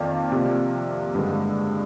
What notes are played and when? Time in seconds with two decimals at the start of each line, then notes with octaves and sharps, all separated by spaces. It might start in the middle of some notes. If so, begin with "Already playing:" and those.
Already playing: F2 D#3 A#3 D5 F5
0.32 C3 F3 A#3
1.15 G2 D3 G#3